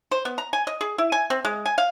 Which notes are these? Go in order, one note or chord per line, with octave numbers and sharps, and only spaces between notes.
C5
B3
A#5
G#5
D#5
G#4
E4
G#5
C4
G#3
G#5
F5